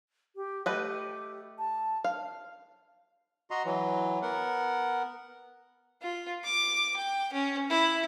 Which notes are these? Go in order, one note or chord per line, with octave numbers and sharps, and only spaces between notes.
G4
A3 G4 B4 D#5
A5
F5
F#4 D#5 A#5 C6
E3 F#3
B3 A#4 F#5
F4
D6
G5
C#4
E4